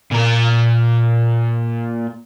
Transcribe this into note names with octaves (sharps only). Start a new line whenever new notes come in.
A#2 A#4